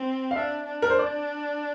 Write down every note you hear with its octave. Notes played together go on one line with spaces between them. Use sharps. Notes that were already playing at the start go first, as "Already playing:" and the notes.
Already playing: C4
F5
D4 E5
D4
A#4
C5
D5